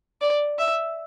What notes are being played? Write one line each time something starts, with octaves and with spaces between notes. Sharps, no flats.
D5
E5